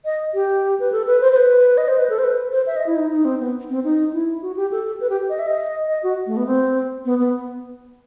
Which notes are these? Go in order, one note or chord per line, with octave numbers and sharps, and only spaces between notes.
D#5
G4
B4
A4
B4
C5
C5
B4
D#5
C5
B4
A4
C5
B4
C5
E5
D#5
E4
D#4
D#4
C4
B3
C4
D#4
E4
F#4
G4
A4
B4
G4
D#5
E5
D#5
D#5
F#4
A3
B3
C4
B3
B3